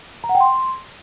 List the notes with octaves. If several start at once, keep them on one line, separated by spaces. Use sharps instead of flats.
A#5
F#5
G5
C6